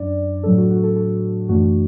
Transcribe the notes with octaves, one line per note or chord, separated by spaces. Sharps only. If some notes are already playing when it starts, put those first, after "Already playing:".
Already playing: F#2 D4 D5
A2 F#3 D4 A4
F#4
F#4
A4
A4
F#2 E3 A3 D4 F#4